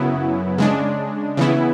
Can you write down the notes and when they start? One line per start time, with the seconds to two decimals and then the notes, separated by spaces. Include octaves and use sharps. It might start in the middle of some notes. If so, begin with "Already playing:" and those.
Already playing: F#2 C#3 F#3 B3 E4
0.58 C#3 G#3 D4
1.37 C#3 E3 B3 E4